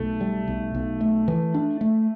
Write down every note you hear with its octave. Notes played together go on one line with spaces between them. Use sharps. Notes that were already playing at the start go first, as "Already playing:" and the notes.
Already playing: B1 A3
G3
B1
B1
A3
E3
D4
A3